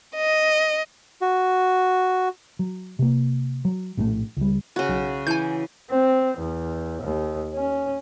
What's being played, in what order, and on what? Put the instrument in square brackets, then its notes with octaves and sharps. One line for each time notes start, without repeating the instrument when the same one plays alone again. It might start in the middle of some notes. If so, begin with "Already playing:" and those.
[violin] D#5
[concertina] F#4
[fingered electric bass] F#3
C3 A#3
F#3
A#1 A2 E3 A3
C#2 G3
[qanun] C#3 F#4
[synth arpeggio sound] B1
[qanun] E3 [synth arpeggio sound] G#5 G6
[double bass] C4
E2
D#2
C#4